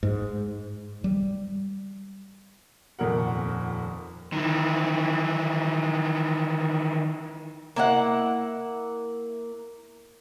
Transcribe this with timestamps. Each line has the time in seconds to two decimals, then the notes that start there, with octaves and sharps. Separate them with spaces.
0.03 G#2
1.04 G3
2.99 D#1 F2 A#2 A#4 F#5
4.32 D#3 E3
7.76 A#3 E4 F#5